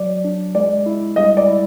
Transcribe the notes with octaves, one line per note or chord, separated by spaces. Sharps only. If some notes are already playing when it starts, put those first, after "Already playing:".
Already playing: F#3 D5
D4
G#3 D5
E4
G3 D#5
D5
E4